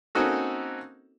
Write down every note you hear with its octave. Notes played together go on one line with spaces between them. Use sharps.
A#3 C4 C#4 D#4 F#4 A4